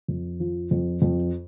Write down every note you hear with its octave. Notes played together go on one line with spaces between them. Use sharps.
F2
F3
F2
F2